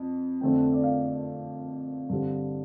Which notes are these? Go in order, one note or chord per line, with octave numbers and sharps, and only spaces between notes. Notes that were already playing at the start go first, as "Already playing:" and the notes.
Already playing: F2
F2 D3 A3 C4 G5
D5
F5
G2 D3 G3 C4